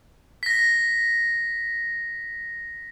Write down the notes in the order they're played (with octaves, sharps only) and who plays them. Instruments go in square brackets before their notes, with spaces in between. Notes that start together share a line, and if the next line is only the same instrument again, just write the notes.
[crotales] A#6 B6